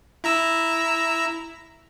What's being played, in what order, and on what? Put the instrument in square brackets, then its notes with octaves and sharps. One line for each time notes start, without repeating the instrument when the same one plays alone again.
[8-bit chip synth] E4 A#5 E6